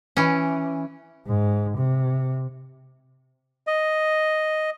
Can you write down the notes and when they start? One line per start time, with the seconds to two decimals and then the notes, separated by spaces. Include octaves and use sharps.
0.17 E3 C#4
1.27 G#2
1.78 C3
3.67 D#5